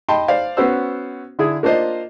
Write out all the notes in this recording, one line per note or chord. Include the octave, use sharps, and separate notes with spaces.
D#5 G5 A5 B5 C6
C5 D5 F5
B3 C#4 F#4 C5 E6
D3 E4 G#4
A#3 D4 F4 C5 D#5